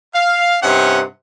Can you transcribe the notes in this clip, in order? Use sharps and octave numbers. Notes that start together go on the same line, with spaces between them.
F5
G2 C3 C4 C#4 D#4 F#5